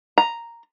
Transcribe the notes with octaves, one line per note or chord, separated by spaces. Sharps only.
A#5